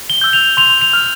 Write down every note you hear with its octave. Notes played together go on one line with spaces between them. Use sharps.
G7
E6 G6
F7
C6 F7
F7
F6